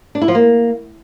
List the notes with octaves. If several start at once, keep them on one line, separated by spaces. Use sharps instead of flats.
D4
E4
F3
A#3